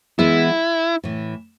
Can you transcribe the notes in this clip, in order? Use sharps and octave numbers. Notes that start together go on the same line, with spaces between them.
E3 G#3 B3 E4
A2 E3